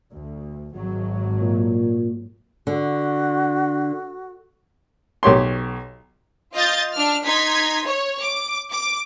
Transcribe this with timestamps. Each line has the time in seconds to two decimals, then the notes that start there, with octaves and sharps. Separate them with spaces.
0.12 D2
0.75 G#1 F#3
1.41 A#2
2.67 D3 F#4
5.23 B1 G4 C#5 C6
6.55 F4 D#5 F5 G6 A6
6.93 D4 F6
7.25 D#4 C6 G#6 B6
7.86 C#5
8.22 D6
8.71 D6